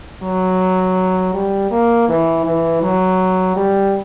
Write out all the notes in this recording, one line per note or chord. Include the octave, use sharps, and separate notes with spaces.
F#3
G3
A#3
E3
E3
F#3
G3